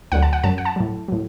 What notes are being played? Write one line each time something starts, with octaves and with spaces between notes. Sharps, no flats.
D2 D3 F#3 F#5
A5
F#5
F#2 F#3 A5
F#5
A5
A2 F#3
A2 F#3